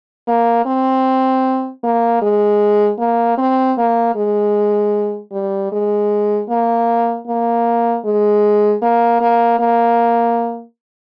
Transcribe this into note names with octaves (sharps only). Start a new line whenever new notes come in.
A#3
C4
A#3
G#3
A#3
C4
A#3
G#3
G3
G#3
A#3
A#3
G#3
A#3
A#3
A#3